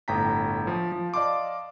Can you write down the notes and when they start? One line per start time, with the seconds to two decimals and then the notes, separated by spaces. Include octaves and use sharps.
0.08 G1 A2 G5 A#5 B6
0.67 F3
0.92 F3
1.14 D5 D#5 F5 A5 C6 D6